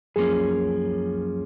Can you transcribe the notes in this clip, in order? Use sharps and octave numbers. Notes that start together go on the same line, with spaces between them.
F#2 F3 A#3 C#4 G#4